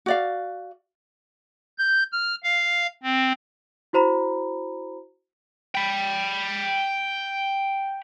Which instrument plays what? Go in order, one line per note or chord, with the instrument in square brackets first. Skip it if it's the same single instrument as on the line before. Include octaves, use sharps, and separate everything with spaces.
[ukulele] F#4 D5 F5
[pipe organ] G6
F6
F5
C4
[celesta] E4 F#4 C5 A#5 B5
[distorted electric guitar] G5 B5